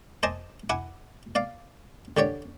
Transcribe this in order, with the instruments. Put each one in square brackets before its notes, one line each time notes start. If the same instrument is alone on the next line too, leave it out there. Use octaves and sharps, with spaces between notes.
[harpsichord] C5 D#5 G#5 A5 D6
E4 F#5 G#5 D6
D5 F5 D6
D3 G4 C#5 D5